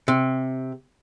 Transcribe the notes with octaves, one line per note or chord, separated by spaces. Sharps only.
C3